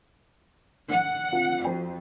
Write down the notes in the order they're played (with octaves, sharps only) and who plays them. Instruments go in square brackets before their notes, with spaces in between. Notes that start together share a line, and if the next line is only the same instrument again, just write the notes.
[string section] F#5
[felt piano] C4 F4
[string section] F2 [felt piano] F#4 C5 G5